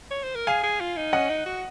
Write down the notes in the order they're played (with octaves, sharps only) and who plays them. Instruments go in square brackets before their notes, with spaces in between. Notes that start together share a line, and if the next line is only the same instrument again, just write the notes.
[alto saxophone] C#5
C5
A#4
[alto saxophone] G#4 [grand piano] F5 G#5
[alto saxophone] G#4
F4
D#4
[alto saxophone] C#4 [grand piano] D#5 F#5
[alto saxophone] D#4
F#4